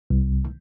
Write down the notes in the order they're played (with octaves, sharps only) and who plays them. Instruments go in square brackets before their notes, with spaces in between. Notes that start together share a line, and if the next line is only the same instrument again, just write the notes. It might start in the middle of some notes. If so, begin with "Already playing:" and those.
[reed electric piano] C2